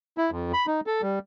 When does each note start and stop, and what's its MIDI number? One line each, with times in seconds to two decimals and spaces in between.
0.18 0.30 64
0.31 0.52 41
0.53 0.66 83
0.67 0.80 63
0.87 1.02 69
1.02 1.19 55